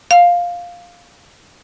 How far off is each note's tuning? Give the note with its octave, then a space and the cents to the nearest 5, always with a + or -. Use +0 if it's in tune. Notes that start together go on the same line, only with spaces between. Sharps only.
F5 +5